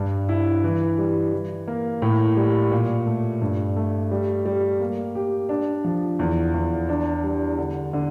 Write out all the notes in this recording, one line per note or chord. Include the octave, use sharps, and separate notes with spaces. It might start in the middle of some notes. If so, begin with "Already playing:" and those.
Already playing: G2 D4
E4
E3
G3
E3
A#3
A2
G3
A#2
A3
G2
A3
G3
G3
A#3
G4
D4
F3
E2
E2
D4
G3
D3
D3